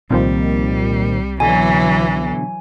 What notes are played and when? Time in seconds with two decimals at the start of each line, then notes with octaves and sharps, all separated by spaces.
0.10 C2 A#2 D#3 F3 G3 C4
1.40 B2 D3 E3 F#3 G#5